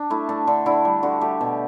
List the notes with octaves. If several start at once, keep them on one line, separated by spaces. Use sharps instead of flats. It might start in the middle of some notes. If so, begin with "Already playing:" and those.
Already playing: D4
A3 E4
A3 D4
D3
D3 E4
G3
D3 F#4
A3 G4
B2